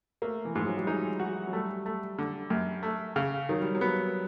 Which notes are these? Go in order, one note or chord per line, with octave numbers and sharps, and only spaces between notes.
A3 A#3
E3
G#2 F3
F#3
G3
G#3 D#4
F#4
F#3
G3 A3
A3
D3
F#2
A3
C#3
D#3 F#3
G3
F#3
B3